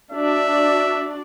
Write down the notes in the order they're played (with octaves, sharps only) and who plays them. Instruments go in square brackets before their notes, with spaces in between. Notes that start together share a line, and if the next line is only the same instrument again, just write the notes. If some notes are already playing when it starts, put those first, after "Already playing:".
[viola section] D4 F#4 D5 [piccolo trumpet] E5